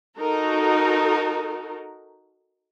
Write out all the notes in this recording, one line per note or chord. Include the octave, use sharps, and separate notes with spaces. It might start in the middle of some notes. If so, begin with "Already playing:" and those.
D#4 F#4 A4 A#4